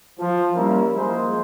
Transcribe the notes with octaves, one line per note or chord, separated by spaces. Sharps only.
F3
G3 A#3 C#4 E4 A#4
F3 G#3 A#3 G#4 C5